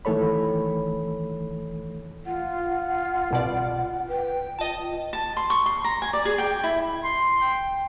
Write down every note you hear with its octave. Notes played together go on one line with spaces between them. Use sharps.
D#3 E3 A3 A4 C#5 B5
F4 F#5
C2 B2 D5
B4 G5
F4 D#5 A5
A5
C6
C#6
C6
A#5
G#5
D5
G#4
G5
E4
C6
G5